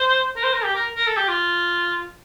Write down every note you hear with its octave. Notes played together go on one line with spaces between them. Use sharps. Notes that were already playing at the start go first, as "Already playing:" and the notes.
Already playing: C5
A#4
C5
A#4
G4
A#4
A#4
A4
G4
F4